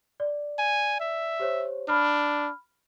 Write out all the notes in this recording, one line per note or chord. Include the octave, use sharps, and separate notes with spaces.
D5
G#5
E5
G4 C5 C#5
D4 B5 F6